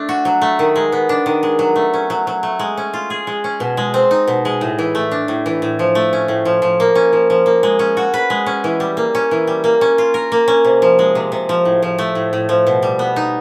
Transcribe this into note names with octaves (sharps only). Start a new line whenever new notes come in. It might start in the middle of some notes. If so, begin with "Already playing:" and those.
Already playing: A3 D4
F#4
F#3
A3
D#3
G#3
B3
D4
D#3
G#3
F#3
A3
C#4
F#3
F#3
A3
G#3
C#4
F4
G#4
G#3
C#4
B2
G#3
C4
D#4
B2
G#3
A2
E3
A3
D4
A2
E3
A2
F3
A3
C#4
A2
F3
F3
A#3
C#4
F3
F3
A#3
G#3
C#4
F#4
B4
G#3
C#4
E3
G3
A#3
C#4
E3
G3
A#3
C#4
F4
A#4
A#3
C#4
C3
F3
G#3
C3
C3
F3
A2
F3
A3
A2
A2
F3
B2
G3
B3
D#4